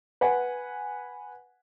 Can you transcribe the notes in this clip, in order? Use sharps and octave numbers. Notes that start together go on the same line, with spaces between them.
B4 F#5 G#5